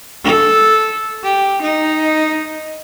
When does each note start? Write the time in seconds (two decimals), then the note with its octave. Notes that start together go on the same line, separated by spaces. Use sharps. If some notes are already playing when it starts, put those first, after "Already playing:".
0.24 A4
1.23 G4
1.62 D#4